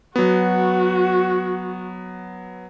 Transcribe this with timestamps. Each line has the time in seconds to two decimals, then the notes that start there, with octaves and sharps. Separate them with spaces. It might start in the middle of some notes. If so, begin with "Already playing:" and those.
0.16 F#3 B3 F#4